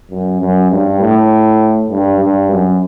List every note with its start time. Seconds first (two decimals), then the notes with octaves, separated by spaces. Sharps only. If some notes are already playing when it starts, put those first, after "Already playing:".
0.11 F#2
0.41 F#2
0.71 G2
1.00 A2
1.91 G2
2.20 G2
2.51 F#2